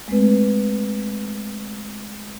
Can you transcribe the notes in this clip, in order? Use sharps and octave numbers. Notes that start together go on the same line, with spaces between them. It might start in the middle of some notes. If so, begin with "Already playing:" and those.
G#3 A3 C4 B4